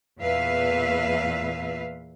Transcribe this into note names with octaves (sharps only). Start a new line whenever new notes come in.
E2 A#2 B4 E5 F5